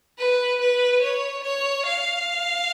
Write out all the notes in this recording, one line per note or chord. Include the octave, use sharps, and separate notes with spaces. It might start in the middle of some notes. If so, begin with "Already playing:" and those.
B4
B4
C#5
C#5
F5